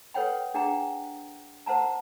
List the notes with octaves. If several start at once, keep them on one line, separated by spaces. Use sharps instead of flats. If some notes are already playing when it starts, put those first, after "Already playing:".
A4 B4 C#5 F#5 G5 B5
D4 G#4 A#4 F#5 G5 A#5
A#4 C5 F#5 A5 A#5